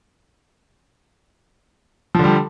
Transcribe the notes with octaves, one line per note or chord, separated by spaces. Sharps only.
D3 F3 G3